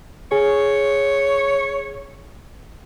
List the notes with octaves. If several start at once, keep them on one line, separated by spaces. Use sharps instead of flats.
G#4 C#5